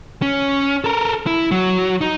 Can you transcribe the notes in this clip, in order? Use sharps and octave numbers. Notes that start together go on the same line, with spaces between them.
C#4
A4 A#4
E4
F#3
D#4